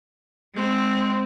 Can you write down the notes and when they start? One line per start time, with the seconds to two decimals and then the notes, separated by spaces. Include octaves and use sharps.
0.55 G#3 C4